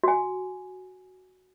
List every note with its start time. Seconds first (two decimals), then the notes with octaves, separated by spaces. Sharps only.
0.04 F#4 G#5